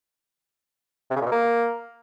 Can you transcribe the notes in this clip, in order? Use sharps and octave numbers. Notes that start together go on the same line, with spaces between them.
C3
C#3
A#2
B2
A#3